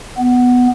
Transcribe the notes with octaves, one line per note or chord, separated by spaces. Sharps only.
B3